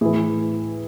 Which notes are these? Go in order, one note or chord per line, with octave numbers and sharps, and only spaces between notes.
A2 E3 E4 G#4